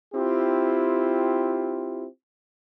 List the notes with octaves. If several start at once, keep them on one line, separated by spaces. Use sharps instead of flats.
C4 E4 F4 G4